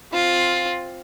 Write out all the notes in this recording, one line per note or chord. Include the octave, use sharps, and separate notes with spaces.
C4 F4